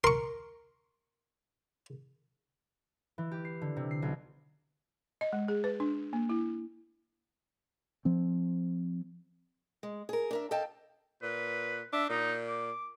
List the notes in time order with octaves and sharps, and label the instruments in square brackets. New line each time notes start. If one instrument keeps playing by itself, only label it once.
[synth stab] A#4 [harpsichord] C6 C#6
[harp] E3
G4
C7
D3
C3
C7
B1
[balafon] D#5
G#3
G#4
B4
D4
A#3
E4
[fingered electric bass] F3 C4
[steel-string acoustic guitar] G#3
G#4 A#4
D4 A#4 E5
A4 D#5 F5 G5 A5
[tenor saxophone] A#2 [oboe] B4
[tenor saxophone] D4 [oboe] E5
[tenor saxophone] A#2 [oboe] D#4
[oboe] D6